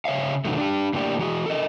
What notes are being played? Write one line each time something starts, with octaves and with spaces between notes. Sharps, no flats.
C#3 C#5 E5 F5
B2 D3 D#3 F#3 A3
D4 G4
A2 D3 A#3 G4 D5
E3 F#4 G#4
A4 A#4 D#5